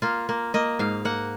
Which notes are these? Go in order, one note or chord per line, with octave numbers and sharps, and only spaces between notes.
A#3 F4
A#3
A#3 D#5
G#2 F5
A#3 F#5